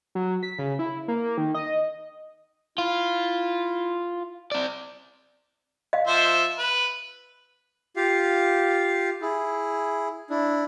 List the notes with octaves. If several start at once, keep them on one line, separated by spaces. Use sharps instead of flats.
F#3
B6
C#3
E4
A#3
D#3
D#5
E4 F4
C4 D5
D#5 F5
F3 C5 E5
B4
F4 G4 F5
E4 G#4
D4 E4